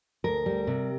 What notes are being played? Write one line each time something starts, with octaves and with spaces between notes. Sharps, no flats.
D2 A#4
G3
C3